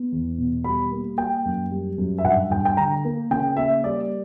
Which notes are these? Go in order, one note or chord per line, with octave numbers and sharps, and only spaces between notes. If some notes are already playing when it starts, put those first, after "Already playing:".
Already playing: B3
E2
B2
G3 B5
A#3
A#3 G5
F#2
G3
F#2
E5
G2 F#5
G2 G5
G5
D3 A#5
A#3
C#3 G5
A#3 E5
G3 D5